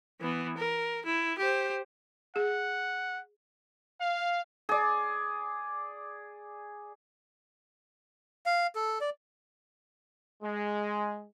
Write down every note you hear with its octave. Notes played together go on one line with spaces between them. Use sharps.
E3 B3
A#4
E4
G4 C5
G#4 F#5
F5
G#4 D5
F5
A4
D5
G#3